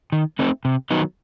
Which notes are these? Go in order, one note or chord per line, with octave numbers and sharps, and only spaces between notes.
D#3
A3 C4 D#4
C3
D#3 F#3 B3 D#4